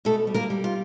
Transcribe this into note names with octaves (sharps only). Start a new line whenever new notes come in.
B2 A3 A4
G3
A#3 A#4
G3
F4